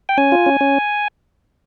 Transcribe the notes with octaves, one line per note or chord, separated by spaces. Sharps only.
G5
C#4 G#5
F4
C#4
C#4